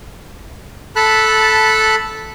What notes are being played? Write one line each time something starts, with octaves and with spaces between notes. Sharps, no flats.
A4 A5 B5 F#6